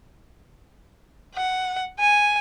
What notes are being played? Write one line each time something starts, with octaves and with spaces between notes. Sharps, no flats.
F#5
G#5